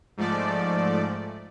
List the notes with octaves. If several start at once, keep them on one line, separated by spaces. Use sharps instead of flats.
G#2 F3 A3 D5